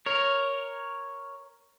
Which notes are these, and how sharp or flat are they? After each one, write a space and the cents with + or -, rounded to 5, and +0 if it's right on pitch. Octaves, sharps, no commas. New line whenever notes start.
A#4 +0 C#5 +0